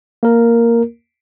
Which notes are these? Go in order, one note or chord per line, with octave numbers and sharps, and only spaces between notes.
A#3 A#4